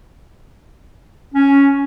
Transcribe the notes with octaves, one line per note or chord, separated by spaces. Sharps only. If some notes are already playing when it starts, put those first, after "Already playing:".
C#4